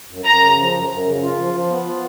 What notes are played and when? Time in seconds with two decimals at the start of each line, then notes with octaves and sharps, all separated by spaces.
0.09 F#2
0.25 F#2 A#5
0.41 C#3
0.57 F3
0.73 F#2
0.90 F#2
1.06 C#3
1.22 F4
1.38 F3
1.54 F3
1.70 B3
1.86 F4